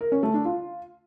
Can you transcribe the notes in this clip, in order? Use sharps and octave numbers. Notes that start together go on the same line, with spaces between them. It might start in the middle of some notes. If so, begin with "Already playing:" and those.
A#4
C#4
A3
D4
F4